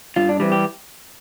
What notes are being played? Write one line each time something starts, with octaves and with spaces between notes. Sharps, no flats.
G2 F4
D4
E3 G3 C4
G4